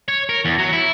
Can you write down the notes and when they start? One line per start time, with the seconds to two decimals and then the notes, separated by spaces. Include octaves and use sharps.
0.08 C#5
0.29 A#4
0.45 E2
0.59 F#3
0.73 E4